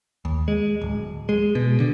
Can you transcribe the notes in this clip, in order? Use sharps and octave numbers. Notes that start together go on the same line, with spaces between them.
D#2
G#3
D1
G#3
B2
D3